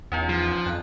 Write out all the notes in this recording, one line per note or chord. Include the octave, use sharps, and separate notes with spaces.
E2 C#4 D#4 F4
F3
F2 F#6